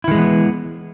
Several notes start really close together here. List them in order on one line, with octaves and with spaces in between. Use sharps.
E4 D#3 G#3 E3 B3